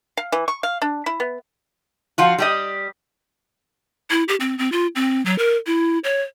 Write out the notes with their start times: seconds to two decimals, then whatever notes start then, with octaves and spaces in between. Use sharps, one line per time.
0.17 F5
0.32 E3
0.48 C#6
0.63 F5
0.82 D4
1.06 E4
1.20 B3
2.18 F3 F4 F#4
2.38 G3 G4 D#5
4.11 E4
4.28 G4
4.40 C4
4.58 C4
4.72 F4
4.96 C4
5.26 F#3
5.38 A#4
5.66 E4
6.04 C#5